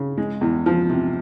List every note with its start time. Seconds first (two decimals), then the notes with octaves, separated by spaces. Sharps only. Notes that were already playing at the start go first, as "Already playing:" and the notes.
Already playing: C#3
0.18 G#3
0.41 E2
0.66 F3
0.90 C3